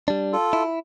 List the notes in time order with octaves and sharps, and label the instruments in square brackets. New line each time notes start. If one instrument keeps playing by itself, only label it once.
[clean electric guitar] G3 D4
[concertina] F4 A4
[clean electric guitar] E4